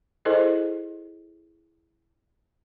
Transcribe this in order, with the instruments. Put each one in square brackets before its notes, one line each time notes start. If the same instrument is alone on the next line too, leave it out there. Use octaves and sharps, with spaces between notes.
[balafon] E4 G#4 A4 C5 D#5